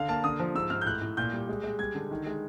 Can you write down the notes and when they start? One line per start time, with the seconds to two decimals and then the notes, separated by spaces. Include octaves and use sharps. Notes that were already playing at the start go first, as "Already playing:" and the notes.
Already playing: D3 F5
0.09 A#3 A5
0.24 D3 D#6
0.40 F3
0.55 G#2 E6
0.70 G#2 F6
0.81 G6
0.86 A2 F#6
1.01 A2
1.17 A#2 G6
1.33 G3
1.49 G#3
1.64 G#3
1.79 G3 G#6
1.95 D3
2.11 D#3
2.26 G#3